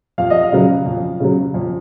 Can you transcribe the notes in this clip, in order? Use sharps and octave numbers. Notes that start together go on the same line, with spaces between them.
F2 F5
D#5
F5
C#3 F#3
F2
C#3 F#3
F2